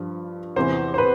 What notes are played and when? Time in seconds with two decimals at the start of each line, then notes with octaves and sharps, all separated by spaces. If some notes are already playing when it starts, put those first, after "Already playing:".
Already playing: G2 F3
0.56 E2 C3 E3 C5
0.94 C5
0.98 B4